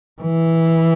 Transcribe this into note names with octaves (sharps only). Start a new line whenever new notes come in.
E3